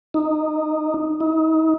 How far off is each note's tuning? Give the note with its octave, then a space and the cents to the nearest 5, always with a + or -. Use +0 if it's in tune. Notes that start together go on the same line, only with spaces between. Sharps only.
D#4 -10
D#4 +40